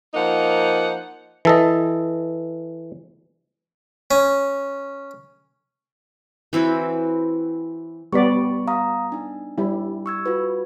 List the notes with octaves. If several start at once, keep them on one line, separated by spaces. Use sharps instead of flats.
F3 A#3 D#4 F#5
E3 A4 D#5
C#4
E3 C4 E4 F#4
G3 B3 D5 C#6 B6
F5 A#5 D#6
D4 D#4
G3 E4
C#6 E6 G#6
F4 F#4 B4